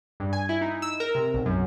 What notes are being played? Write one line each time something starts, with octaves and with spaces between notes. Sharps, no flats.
G2
G#5
E4
D#4
E6
A#4
C3
B1
F#2